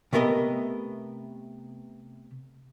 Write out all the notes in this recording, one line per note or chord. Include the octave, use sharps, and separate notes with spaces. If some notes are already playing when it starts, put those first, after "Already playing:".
C3 A3 B3 A#4 D#5